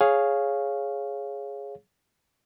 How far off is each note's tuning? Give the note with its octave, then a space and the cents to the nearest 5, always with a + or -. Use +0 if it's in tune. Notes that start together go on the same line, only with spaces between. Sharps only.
G#4 +0 C#5 +0 F5 +0